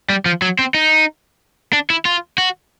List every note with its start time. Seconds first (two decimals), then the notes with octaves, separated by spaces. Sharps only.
0.10 G3
0.26 F3
0.42 F#3
0.59 C4
0.74 D#4
1.73 D4
1.90 E4
2.05 F4
2.38 F#4